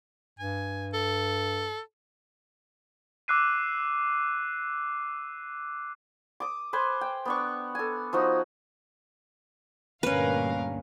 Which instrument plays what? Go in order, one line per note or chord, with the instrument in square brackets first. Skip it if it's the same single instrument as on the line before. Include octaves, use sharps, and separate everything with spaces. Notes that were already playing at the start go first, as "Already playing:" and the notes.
[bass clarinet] G2 [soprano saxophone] G#5
[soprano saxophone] A4
[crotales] D6 E6 F#6 C7 D#7
[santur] D6 D#6
B4 C5 G#5 D6
G5
B3 D4 C#6
A4 G#5
F3 D#4 F#4
[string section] D2 G2 A#2 [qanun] C#4 B4 [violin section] A#4 F5